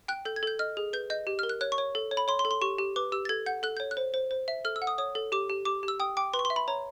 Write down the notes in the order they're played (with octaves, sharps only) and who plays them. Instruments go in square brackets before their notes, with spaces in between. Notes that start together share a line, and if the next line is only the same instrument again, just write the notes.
[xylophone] G5 F#6
A4 G6
G#6
A4 G6
D#5 F6
G#4
B4 G6
D#5 G6
G4
A#4 F6
F#6
C#5 F#6
C#6
C#5
A4
C#5
B5
C#5 C6
C6
A4
C6
G4 C#6
G4
B4 D6
G4 E6
A6
A4 G#6
F#5 G6
A4 F#6
C#5 G6
F#6
C5
C5
C5
E5
A4 F6
E6
F#5
D#6
C#5 D#6
A4
G4 D6
G4
G4 D6
G4
E6
G5 D#6
G5 D6
B4 C6
C#6
C6
E5
B5
C#5 A#5